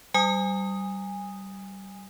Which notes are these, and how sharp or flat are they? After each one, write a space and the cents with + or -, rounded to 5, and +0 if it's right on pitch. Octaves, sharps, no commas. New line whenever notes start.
G3 -20 G#5 -20 D#6 +0